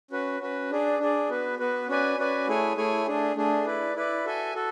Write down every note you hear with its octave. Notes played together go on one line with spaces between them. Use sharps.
C#4 F#4 B4
C#4 F#4 B4
D4 G#4 D5
D4 G#4 D5
B3 F#4 B4
B3 F#4 B4
C#4 F#4 B4 D5 G#5
C#4 F#4 B4 D5 G#5
A3 E4 G#4 C#5 G#5
A3 E4 G#4 C#5 G#5
A3 D4 G#4
A3 D4 G#4
E4 B4 D5
E4 B4 D5
F#4 A4 E5 G#5
F#4 A4